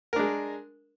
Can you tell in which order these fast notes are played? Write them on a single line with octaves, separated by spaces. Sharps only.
A#4 D4 G#3